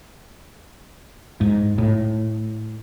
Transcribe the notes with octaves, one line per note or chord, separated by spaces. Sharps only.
G#2
A2